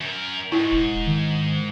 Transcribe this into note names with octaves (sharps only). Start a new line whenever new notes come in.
F#2 A#4
G#2 E4
D#1
D#3